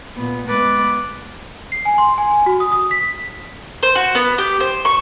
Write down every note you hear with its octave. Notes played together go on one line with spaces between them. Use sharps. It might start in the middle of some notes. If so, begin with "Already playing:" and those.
A#2 B3
G#3 B3 B4 D6 A6
C7
G#5
C6
G#5
G#5
F#4
D#6
D#6
B6
C5
F#4
B3
G4
C5
C#6